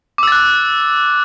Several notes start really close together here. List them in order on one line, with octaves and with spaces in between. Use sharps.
D6 E6 A6 F#6